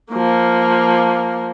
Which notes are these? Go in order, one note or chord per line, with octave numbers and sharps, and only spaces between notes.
F3 A#3